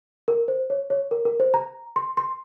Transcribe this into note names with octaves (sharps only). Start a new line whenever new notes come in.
A#4
C5
C#5
C#5
A#4
A#4
C5
A#5
C6
C6